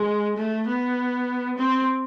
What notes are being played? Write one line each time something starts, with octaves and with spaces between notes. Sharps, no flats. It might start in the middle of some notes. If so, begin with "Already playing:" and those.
Already playing: G#3
A3
B3
C4